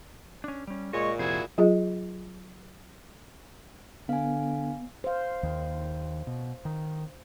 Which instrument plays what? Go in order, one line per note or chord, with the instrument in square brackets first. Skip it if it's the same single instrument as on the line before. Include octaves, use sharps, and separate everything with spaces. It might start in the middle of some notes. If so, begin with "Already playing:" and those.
[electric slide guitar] C#4 D4
G3 C#4
[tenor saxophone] A#2 [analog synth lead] G#3 [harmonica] C#5 C#6 [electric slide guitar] D#5
[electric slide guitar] F2 C3 C5 [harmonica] E4 F#4 G#4 [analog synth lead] G#6
[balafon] F#3 F4 G#4 D#5
[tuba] D3 [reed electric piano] B3 [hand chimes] F5 G#5
[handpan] C5 F5
[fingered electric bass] D#2 D#3
B2
D#3